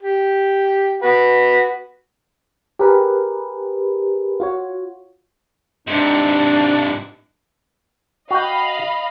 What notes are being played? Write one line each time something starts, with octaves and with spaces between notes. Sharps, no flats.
G4
F#4 B4 F#5
G4 G#4 A#4 B4
F4 F#4 C#5
G#2 C3 D4
F#4 D#5 F5 G5 B5